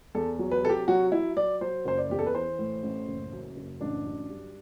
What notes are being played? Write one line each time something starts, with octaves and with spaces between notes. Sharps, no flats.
E2 A4
F#3
B4
C3 A4
G4
F#3 F#4
F#3 E4
F#3 D5
F#3 C5
F#1 C5
D5
E2 G4
A4
B4
E3 C5
A2
A1
F#1
F#2
F#1
A1 D4
F#3
G2